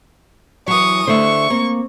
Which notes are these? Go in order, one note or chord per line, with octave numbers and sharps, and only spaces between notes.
E3 F#3 C#6 D#6
D3 A3 C5 E5 C#6
A#3 C4